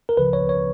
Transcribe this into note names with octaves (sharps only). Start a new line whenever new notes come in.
A#4
C#2 C#3 F3 B4
C#5
C#5